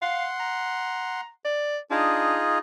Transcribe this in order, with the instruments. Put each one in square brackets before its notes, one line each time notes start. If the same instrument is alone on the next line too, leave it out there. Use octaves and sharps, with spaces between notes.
[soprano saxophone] F5 [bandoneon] F#5 C6
[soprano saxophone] A#5
D5
[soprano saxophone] D4 [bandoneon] D#4 F4 G#4